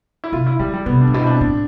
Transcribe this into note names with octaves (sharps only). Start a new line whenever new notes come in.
E4
C3 F4
E4
D3 G3
G3
C3 B3
D4
A2
B2 E4
C4
D4
A2 D4